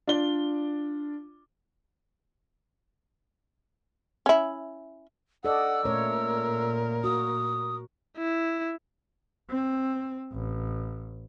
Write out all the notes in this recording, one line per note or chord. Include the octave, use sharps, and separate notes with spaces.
D4 F4 D5 G7
C#4 E4
A4 D5 D#5 F#5 E6
A#2 A3 A#4 C#5
F#4 D#6
E4
C4
A1